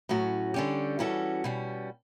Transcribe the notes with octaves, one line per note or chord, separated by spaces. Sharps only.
A2 F#3 C#4 F#4
D3 G3 C#4 G4
E3 G3 C#4 F#4 A4
B2 G3 C#4